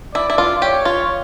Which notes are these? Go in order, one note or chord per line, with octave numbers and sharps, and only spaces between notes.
E4 D5
E4
F4
G4 C#5
F4